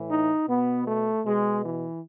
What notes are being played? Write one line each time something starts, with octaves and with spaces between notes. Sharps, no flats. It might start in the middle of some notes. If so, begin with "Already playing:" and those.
Already playing: A2 E3
D#4
B2 B3
A3
B2 G#3
E3